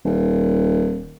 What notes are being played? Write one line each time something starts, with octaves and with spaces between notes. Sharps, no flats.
D#1